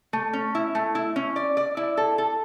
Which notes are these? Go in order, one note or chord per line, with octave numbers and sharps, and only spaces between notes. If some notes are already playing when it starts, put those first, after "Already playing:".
A3
C#4
E4
A3
E4
C#4
D5
D5
E4
A4
A4